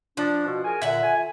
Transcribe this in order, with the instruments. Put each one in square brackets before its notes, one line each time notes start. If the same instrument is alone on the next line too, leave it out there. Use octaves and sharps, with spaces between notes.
[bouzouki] F3 [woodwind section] D4
[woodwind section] B2
G#4 A#4 G#5
[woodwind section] A#2 D3 [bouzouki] E5 F#5
[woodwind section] A3 F4 G#5